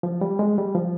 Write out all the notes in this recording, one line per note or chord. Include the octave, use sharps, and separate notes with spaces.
F3
G3
G#3
G3
F3